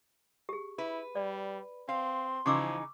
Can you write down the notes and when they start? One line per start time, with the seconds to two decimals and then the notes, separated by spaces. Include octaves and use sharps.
0.49 G4 G#4
0.78 E4 B4
1.15 G3 D5
1.89 C4 F5 C6
2.46 C#3 E3 F3 D#4 C#6 D6 E6